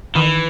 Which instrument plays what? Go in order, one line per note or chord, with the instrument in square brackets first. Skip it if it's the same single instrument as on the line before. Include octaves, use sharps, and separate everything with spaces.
[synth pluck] D#3 [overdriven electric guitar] E3